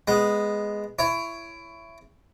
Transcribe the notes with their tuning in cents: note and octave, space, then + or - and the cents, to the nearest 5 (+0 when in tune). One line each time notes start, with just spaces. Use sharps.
G#3 +0 B3 +0
E4 +20 C#5 +5